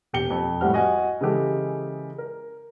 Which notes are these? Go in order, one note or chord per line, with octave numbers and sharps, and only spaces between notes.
E1 G4 G5 C#7 G7
F2
A2 G3 C4 F#5 F6
F#4 D#5 F#5 G#5
C#3 E3 G#3 G4 A4
A#4